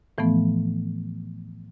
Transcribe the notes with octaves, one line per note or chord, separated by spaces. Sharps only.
A2 E3 F3 A3 B3